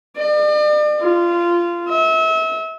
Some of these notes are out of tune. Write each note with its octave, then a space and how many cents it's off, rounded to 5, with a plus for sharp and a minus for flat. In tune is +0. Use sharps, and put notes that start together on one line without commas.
D5 +40
F4 -15
E5 -35